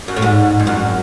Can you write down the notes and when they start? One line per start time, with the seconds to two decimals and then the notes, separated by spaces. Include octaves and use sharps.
0.08 F#2
0.16 A2
0.22 G#2
0.60 F2
0.67 F#2